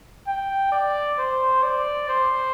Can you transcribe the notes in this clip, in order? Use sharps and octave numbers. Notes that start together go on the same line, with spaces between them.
G5
D5
C5
D5
C5